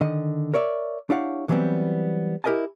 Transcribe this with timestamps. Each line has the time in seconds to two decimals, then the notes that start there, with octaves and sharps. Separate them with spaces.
0.01 D3 D#3 D#5
0.54 A#4 C#5 D5 E5
1.10 D4 E4 G4 C#5 F5 F#5
1.48 D3 E3 F#3 G3 B3 C4
2.44 E4 G4 A#4 D#5 G#5 A5